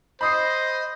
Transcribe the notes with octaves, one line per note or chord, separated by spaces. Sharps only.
C5 D#5 B5 D#6 C7